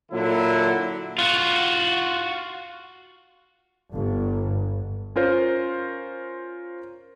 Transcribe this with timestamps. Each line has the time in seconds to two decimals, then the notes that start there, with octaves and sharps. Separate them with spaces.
0.11 A#2 D3 F#3 E4
1.18 F4 F#4
3.95 G1 G2
5.16 C#4 F4 A#4 C5 C#5